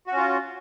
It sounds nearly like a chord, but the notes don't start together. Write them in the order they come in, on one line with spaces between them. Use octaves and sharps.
F#4 C#4 F4